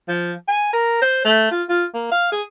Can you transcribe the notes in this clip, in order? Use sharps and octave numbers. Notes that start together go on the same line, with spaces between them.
F3
G#5
A#4
C5
A3
F4
F4
A#3
F5
G#4